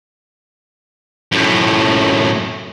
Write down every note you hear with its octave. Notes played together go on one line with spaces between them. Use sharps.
F#2 A2